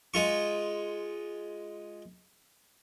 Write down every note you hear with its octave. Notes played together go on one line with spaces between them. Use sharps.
G#3 F4 C#6